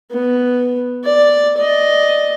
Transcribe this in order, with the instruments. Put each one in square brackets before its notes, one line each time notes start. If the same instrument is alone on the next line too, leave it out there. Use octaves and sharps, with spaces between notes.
[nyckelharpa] B3
D5
D5 D#5